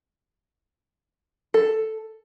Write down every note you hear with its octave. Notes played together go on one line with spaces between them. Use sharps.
A4